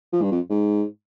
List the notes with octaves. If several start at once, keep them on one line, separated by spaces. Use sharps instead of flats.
F3
G2
F2
G#2